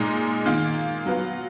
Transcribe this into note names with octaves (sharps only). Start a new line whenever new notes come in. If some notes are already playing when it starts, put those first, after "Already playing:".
Already playing: A#2 G#3 D#4
D#3 A#3 F4
F#3 B3 F4